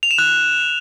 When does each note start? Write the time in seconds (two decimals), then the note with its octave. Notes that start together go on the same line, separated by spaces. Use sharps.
0.03 F7
0.11 E7
0.18 F#6